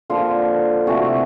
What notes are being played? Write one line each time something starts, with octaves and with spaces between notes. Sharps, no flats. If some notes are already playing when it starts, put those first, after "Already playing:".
D3 F3 A#3 F4
C3 E3 A3 F#4